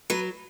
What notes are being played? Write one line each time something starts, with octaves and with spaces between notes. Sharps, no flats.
F#3 B4